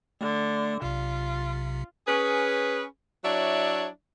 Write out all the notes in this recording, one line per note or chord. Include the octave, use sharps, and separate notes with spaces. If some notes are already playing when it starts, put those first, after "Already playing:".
D3 A3
B1 C3 F4
C#4 G#4 B4
F#3 D4 E4 C#5 D5 E5